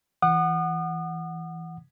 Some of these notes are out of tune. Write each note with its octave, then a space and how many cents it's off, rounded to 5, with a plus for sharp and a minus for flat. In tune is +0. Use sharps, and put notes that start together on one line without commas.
E3 +0 F#5 +0 D#6 -40